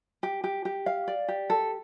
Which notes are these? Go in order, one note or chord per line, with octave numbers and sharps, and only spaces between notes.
G4
G4
G4
F5
D5
G4
A4